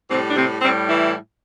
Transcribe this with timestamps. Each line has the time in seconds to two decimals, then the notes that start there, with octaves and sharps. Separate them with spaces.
0.09 A2 C3 G3 C4
0.29 D4
0.35 C3 C4
0.61 A2 C3 G3 C4
0.88 E3 E4